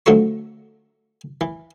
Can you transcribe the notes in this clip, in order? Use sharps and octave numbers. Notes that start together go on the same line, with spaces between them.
D3 F3 F#3 A3 C#6
E3